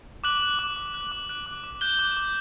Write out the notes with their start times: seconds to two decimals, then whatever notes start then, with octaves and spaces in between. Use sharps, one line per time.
0.24 D6 F#6 F#7
0.41 F#6
0.59 D6
0.76 D6
0.94 F#6
1.12 D6
1.29 F#6
1.46 D6
1.64 D6
1.81 F#6 G6 G7
1.99 D6
2.17 D6